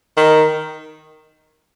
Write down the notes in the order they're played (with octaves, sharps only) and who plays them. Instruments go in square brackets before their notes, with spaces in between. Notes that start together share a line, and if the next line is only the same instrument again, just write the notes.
[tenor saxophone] D#3